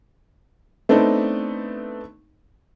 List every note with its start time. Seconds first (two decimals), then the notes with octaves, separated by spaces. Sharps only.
0.89 A3 B3 C4 D4 D#4